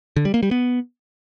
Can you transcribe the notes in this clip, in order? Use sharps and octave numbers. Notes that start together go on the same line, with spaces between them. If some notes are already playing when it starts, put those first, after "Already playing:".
D3
G3
A#3
G3
B3